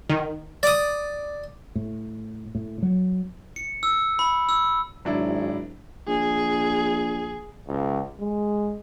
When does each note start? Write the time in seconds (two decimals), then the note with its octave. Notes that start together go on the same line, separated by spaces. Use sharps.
0.10 D#3
0.63 D5 D#6
1.75 A2
2.55 A2
2.82 F#3
3.56 C#7
3.83 E6
4.19 B5
4.49 E6
5.05 G#1 F#3 D4 E4
6.08 A#1 G#4
7.68 C#2
8.20 G#3